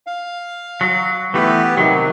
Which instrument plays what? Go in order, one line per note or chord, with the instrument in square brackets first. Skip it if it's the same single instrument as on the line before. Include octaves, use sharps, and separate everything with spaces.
[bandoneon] F5
[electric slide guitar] F#3
[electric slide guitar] E3 A3 [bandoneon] B3 G4 B4
[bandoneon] C3 D#3 [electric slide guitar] F#3